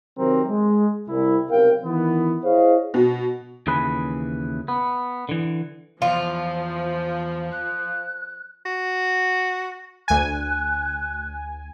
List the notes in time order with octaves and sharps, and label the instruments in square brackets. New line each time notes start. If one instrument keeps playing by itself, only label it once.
[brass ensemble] C3 D#3 F#3 C4 G4 A#4
G#3
C2 E4
B1 C3 A#4 F5 G5
D#3 E3 B3
E4 G#4 C5 C#5 D#5 F5
[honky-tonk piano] B2
[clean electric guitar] D#2 C#3 E3 G#4 B4
B3
D3 E3
[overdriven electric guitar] E2 [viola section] F3 [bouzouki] F4
[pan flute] F#6
[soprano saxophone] F#4
[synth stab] D2 G#5 [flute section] F#6